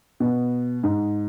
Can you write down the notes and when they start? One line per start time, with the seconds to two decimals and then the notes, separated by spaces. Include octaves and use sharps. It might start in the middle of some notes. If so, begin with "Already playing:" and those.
0.20 B2
0.83 G#2